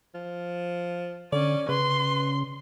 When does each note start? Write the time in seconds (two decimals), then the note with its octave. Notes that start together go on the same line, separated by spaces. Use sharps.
0.14 F3
1.32 D3 C#4 D5
1.69 C#3 B4 C6